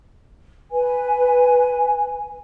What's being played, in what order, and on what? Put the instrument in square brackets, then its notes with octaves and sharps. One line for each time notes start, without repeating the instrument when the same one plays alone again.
[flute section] B4 G#5